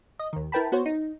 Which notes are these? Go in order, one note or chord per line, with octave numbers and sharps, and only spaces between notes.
D#5
D#2 D#3
E4 A#4 B4 G5 A5 B5
B3 F#4 C5 C#5
D#4